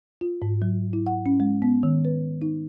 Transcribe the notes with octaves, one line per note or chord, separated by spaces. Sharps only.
F4
G#2
F#3
E4
F#5
C#4
G#3
B3
D#3
B4
D#4